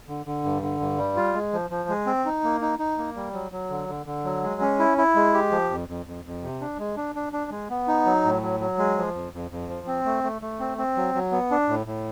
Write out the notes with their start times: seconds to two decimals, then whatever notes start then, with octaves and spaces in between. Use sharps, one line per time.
0.08 D3
0.26 D3
0.44 G2
0.62 D3
0.80 G2
0.98 G3
1.16 F4
1.34 G#3
1.53 F3
1.70 F3
1.89 G#3
2.06 C4
2.25 D#4
2.44 A#3
2.61 D#4
2.79 D#4
2.98 A#3
3.16 G3
3.33 F#3
3.52 F#3
3.70 D3
3.88 D3
4.06 D3
4.25 F#3
4.43 G#3
4.61 C#4
4.79 E4
4.98 E4
5.15 G#3
5.34 G4
5.51 F3
5.70 F2
5.88 F2
6.06 F2
6.25 F2
6.43 C3
6.61 D4
6.78 G#3
6.97 D4
7.15 D4
7.33 D4
7.51 G#3
7.70 B3
7.88 D#4
8.06 F#3
8.25 A2
8.42 F#3
8.60 F#3
8.78 G#3
8.97 F3
9.15 F2
9.33 F2
9.51 F2
9.69 F3
9.87 C4
10.05 A3
10.24 A3
10.42 A3
10.60 C4
10.78 C4
10.96 F#3
11.15 F#3
11.32 B3
11.51 D4
11.69 A2
11.86 A2